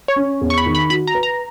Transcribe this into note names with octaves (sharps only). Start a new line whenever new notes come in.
C#5
C#4
E2
C#6
B5
D#3
B5
F#4 B5
A#5
B4
A#5